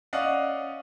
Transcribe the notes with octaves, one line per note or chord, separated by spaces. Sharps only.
C#4 D5 D#5 F5 F#5